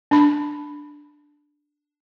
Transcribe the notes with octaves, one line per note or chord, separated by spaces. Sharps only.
D4 B5